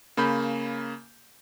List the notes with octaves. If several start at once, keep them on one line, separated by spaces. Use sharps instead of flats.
C#3 A#3 B5 G6